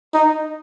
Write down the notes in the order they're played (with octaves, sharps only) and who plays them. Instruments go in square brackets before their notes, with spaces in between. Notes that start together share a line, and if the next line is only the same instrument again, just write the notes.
[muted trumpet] D#4